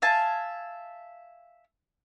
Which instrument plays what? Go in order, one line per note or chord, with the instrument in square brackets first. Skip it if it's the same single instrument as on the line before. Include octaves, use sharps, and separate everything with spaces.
[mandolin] E5 F5 G#5 A5